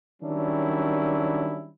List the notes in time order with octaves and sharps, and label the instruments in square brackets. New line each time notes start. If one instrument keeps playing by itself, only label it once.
[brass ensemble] D#3 F#3 G3 C#4 D4 E4